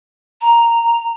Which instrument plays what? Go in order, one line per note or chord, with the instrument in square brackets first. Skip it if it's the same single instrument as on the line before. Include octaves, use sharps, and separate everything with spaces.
[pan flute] A#5